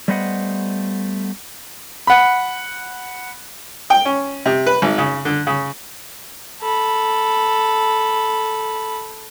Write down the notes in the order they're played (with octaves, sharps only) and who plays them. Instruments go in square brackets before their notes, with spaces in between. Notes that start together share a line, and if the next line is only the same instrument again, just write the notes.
[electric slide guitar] G3 A3 B3 C5 D#5 F#5
[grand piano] F#5 B5
[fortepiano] G5
C#4
C3
B4
G#1
C#3
D3
C#3
[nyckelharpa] A4 B5